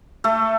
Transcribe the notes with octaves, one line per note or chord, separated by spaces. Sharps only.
A3 A4